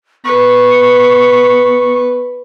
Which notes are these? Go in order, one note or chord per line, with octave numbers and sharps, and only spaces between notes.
B3 B4 C#6